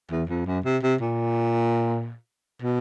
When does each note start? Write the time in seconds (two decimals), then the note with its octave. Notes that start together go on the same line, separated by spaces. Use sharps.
0.12 E2
0.29 F2
0.47 F#2
0.65 C3
0.83 C3
1.01 A#2
2.62 B2